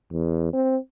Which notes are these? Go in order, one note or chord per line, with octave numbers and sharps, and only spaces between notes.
E2
C4